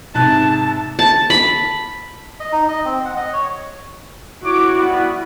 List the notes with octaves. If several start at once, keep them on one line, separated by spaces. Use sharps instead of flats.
G#2 C3 A5 F#6
A5
B5
D#5
D#4
D#5
C4
F#5
D#5
C#5
E4 F#4 C#5 C#6 D6
G3 B3